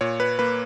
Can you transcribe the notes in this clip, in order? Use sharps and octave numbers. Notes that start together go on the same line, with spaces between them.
A#2 C#5
B4
A#3 B4